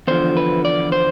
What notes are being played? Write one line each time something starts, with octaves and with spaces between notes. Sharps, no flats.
E2 D3 F3 C5
B4
D5
C5